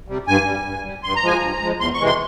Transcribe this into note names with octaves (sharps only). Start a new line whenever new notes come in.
C3 G3
G2 G#5
G3
G2
G3
G2 C6
A#5
F3 G#3 G#5
G2 A#5
F3 G#3
E2 C6
C#6
C3 E3 G#3
C6